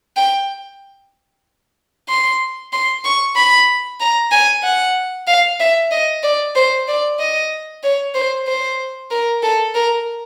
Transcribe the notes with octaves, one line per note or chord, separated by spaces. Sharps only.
G5
C6
C6
C#6
B5
A#5
G#5
F#5
F5
E5
D#5
D5
C5
D5
D#5
C#5
C5
C5
A#4
A4
A#4